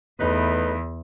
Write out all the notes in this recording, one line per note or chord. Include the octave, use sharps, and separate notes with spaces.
E2 A3 D#4 B4